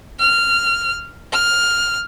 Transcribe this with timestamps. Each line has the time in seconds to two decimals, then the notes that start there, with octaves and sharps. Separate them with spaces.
0.19 F6
1.33 F6